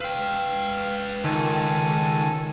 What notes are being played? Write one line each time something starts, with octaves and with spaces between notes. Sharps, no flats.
B4 F5 G5 E6
C#2 D#3 A4 G#5